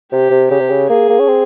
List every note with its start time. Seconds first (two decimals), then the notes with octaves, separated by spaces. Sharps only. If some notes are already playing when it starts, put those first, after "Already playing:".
0.12 C3 G4
0.31 C3
0.51 C#3 G4
0.60 C3
0.69 C#3
0.89 A#3 G#4
1.09 A#3
1.20 C#4
1.28 C4